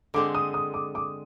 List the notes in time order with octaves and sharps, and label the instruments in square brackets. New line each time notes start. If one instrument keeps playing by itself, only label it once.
[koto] D3 G#3 C4 [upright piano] D6
[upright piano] D#6
D#6
D6
D6